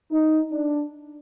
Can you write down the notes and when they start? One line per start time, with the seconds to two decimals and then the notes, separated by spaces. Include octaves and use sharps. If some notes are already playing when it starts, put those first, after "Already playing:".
0.11 D#4
0.51 D4